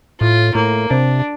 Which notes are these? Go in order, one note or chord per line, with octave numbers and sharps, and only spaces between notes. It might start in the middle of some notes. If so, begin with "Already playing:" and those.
A2 F4
A2 A#3
C3 D4